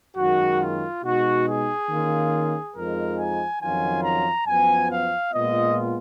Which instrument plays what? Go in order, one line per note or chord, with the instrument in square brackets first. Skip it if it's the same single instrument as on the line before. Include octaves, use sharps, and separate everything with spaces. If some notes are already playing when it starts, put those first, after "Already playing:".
[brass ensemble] F#2 D#3 G#3 F#4
F4
B2 G#3 D#4 F#4
G#4
D#3 A#3 C#4 F4
F2 F3 G#3 D#4 A#4
G#5
F2 D#3 F#3 C#4 F4 G#5
A#5
F#2 F3 B3 G#5
F5
A#2 G#3 B3 F4 D#5